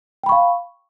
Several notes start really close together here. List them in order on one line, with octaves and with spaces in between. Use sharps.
G5 B5 C#6 F5